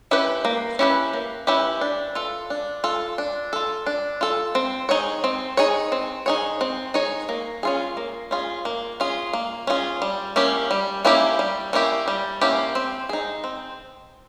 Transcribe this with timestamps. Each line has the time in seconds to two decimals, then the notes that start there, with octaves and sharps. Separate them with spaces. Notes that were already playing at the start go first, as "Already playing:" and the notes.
0.11 C#4 E4 G4 B4
0.45 A#3
0.79 C#4 E4 G4 B4
1.13 A#3
1.47 C#4 E4 G4 B4
1.81 D4
2.15 F4 A4
2.50 D4
2.84 F4 A4
3.18 D4
3.53 F4 A4
3.86 D4
4.21 F4 A4
4.55 C4
4.89 D#4 G#4 C#5
5.24 C4
5.57 D#4 G#4 C#5
5.92 C4
6.26 D#4 G#4 C#5
6.61 C4
6.94 D#4 G#4 C#5
7.29 A#3
7.63 C#4 F4 G#4
7.97 A#3
8.31 C#4 F4 G#4
8.65 A#3
9.00 C#4 F4 G#4
9.33 A#3
9.67 C#4 F4 G#4
10.02 G3
10.36 A#3 C#4 E4 G4
10.71 G3
11.05 A#3 C#4 E4 G4
11.39 G3
11.73 A#3 C#4 E4 G4
12.08 G3
12.41 A#3 C#4 E4 G4
12.75 C4
13.09 D#4 G#4
13.44 C4